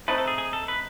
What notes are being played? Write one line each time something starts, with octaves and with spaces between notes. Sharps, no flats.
A3 C4 D#4 B4
A4
G#4
G#4
A4
B4